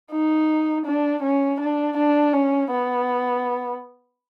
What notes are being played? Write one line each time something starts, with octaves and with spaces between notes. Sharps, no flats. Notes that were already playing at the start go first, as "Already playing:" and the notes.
D#4
D4
C#4
D4
D4
C#4
B3